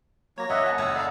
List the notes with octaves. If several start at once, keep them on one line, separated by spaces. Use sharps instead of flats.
F#3 A#3 C#5 A#6
F#2 D#5 E5 F#5 F#6
F#5 G#5 A5
F#1 F#5 D#6 E6 G#6
A4 D5 F5 A#5